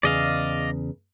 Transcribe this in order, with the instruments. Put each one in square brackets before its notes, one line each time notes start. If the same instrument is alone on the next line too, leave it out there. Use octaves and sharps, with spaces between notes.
[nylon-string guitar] E2 C#3 G#4 [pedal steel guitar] D5 D#5 F5